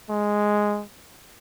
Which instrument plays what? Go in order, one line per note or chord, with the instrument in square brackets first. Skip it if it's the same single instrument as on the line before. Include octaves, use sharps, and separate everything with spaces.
[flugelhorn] G#3